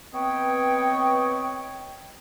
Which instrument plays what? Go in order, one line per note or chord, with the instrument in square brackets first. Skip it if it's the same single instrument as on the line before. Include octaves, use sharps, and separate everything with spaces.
[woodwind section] B3 C4 B4 C#5 D#5 G5